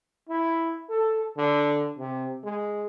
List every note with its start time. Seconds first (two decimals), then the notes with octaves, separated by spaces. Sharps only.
0.29 E4
0.89 A4
1.37 D3
1.99 C3
2.44 G#3